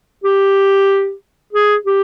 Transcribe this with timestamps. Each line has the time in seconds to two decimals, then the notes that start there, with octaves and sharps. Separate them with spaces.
0.24 G4
1.53 G#4
1.85 G4